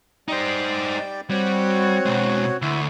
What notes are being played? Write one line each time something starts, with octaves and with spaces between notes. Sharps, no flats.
G3 D#4 C5 D5 G5
G3 C4 F#4 C#5
B2 G#3
D2 E4 E5